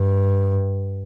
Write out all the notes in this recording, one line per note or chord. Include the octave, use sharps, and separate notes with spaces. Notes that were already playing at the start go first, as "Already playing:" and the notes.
Already playing: G2